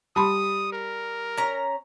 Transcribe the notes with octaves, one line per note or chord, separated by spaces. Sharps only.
G3 A5 B5 C6 D#6
A#4
C#4 A#5